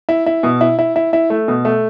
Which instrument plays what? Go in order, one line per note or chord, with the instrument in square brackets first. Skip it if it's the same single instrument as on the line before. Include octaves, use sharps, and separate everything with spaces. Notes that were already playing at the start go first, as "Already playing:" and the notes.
[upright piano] E4
E4
B2
E4
E4
E4
E4
A3
B2
A3